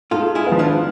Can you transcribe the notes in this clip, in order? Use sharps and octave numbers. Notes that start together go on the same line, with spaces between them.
G#2 F4 A4
E4 G#4
F3 B3
D4 F4